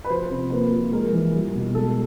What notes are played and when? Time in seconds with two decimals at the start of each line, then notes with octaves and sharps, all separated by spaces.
0.04 B4
0.10 F3 C5
0.30 C3
0.50 A#3 B4
0.72 F3
0.92 G#3 A#4
1.13 E3
1.34 G3
1.54 B2
1.75 G#3 A4